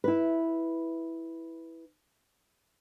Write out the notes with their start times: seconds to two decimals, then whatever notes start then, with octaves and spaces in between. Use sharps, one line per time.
0.04 E4 B4